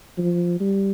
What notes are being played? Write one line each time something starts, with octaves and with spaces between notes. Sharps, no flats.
F3
G3